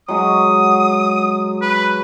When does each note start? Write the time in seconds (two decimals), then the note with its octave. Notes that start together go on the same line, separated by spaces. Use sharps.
0.08 F#3 G#3 F#4 D#6
1.61 B4